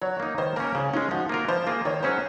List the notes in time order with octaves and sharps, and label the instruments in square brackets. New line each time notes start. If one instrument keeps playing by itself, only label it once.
[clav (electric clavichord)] F#3 [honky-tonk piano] C#5
[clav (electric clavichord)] A#3 D#4
[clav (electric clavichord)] D#3 [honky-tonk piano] C5
[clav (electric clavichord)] A#3 C#4 [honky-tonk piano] A#4
[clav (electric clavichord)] C#3 [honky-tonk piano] C#4
[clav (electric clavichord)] G#3 C#4 [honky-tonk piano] D#4
[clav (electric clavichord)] F3 [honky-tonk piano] F#4
[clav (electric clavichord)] A#3 F4 A#4
[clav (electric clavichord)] F3 [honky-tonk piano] C5
[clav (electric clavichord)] A#3 F4 G#4
[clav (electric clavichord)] D#3 [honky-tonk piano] C#5
[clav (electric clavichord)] F#3 C#4 G#4 [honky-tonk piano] C5